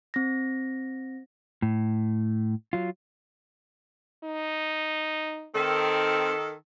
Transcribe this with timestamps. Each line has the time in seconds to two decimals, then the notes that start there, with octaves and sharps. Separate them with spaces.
0.14 C4 A#6
1.62 A2
2.73 F#3 F4
4.24 D#4
5.55 D#3 C4 A4